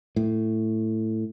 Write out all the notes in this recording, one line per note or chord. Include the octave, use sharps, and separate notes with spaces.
A2